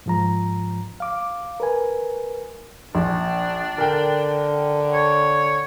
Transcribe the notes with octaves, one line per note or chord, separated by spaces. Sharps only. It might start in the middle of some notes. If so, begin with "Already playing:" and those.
G#2 F3 A#5
F5 D6
A#4 B4 G#5
A#1 D4
D3 A#4 G5
C#5